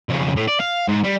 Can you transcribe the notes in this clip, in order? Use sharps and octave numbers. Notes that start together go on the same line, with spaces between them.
F2 C#3
A2
D5
F5
G#2
G3